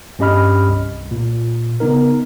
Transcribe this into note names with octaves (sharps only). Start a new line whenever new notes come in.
G2 C#4 G4 D#5 B5 F6
C2
A#2
C#3 B3 D#4 A#4